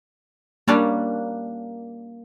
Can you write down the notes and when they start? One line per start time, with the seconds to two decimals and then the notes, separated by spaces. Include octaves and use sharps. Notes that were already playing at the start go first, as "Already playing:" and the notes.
0.68 G3 A#3 C#4 D4